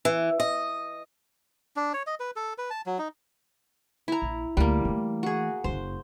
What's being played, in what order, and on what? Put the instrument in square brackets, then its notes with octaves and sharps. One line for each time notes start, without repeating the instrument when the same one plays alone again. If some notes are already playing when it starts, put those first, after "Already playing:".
[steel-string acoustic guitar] E3
D#5
[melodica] D4
C#5
D#5
B4
A4
B4
A5
F#3
D#4
[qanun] E4 A#5
[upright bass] A#1
[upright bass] D2 [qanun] G3 A#3
[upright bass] E3 A3
[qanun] F#4 G#4
[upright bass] F#1 F#2 [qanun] C5